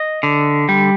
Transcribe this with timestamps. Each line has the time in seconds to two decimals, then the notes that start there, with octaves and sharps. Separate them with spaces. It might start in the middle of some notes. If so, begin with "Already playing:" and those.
Already playing: D#5
0.23 D3
0.69 G3